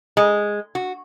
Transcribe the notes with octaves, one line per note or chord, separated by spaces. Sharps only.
G#3
F#4